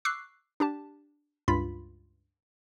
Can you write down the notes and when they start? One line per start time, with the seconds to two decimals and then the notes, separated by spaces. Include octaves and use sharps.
0.05 C#6 D6 E6 F#6 C7
0.60 D4 G4 A5
1.48 C#2 G2 F4 B5 B6